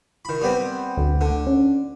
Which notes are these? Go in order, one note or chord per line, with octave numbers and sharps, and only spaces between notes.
D#3 B5
G3 B3 C4
D2
D3
C#4